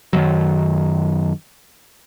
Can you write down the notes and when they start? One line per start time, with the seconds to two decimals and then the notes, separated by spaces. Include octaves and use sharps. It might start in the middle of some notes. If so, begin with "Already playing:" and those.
0.13 F#2 D#3 F#3